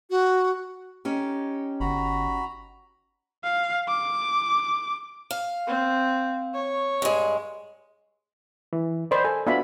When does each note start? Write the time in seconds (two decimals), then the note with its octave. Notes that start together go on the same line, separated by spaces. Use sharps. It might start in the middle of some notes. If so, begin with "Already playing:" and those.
0.10 F#4
1.05 C#4 D#4 G4
1.80 G1 F#4 A#5 B5
3.44 F5
3.88 D6
5.31 F5
5.67 C4
6.54 C#5
7.02 G2 G#3
8.73 E3
9.11 A#4 C5 D5 D#5 B5 C6
9.25 A4 G#5
9.47 B3 D4 F4 F#4 E5 B5